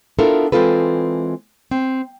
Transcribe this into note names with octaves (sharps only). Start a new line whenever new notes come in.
B3 D4 E4 F4 A4 A#4
E3 G#3 C4 F4 A4 B4
C4